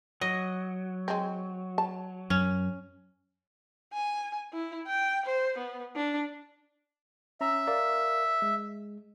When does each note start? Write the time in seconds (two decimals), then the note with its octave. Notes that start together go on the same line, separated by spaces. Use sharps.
0.21 F#3 D#5
1.08 G#3 C4
1.78 A5
2.30 F#2 C#4
3.93 G#5
4.53 E4
4.87 G5
5.25 C5
5.57 B3
5.96 D4
7.41 C#4 E5 A#5
7.67 A#4 D5 F5
8.42 G#3